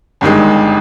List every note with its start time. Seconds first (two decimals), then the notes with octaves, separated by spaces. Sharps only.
0.21 G1 G2 D#3 G#3